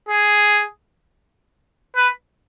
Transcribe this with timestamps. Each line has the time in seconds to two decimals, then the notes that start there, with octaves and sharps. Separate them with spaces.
0.09 G#4
1.96 B4